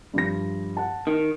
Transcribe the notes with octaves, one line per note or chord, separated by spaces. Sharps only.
G2 F3 A#6
F#5 A5
D#3